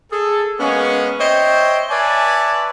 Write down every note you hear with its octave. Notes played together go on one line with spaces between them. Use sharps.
G#4 A4
G#3 A#3 B3 C#4
C5 C#5 D#5 E5 G5
B4 C#5 D5 E5 G#5 A5